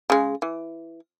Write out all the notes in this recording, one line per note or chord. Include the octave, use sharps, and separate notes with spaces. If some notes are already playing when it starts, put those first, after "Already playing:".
C#3 G#3
E3